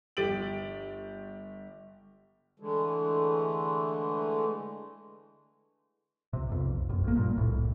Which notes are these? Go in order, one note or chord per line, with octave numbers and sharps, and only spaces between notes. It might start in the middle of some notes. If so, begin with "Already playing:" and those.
G1 G4 A6 D7 F#7
D3 E3 G#3 A3
C#2 C3
B1 F2
A#1 F#2
A1 A#3
G2 A#2
D1 C2 A2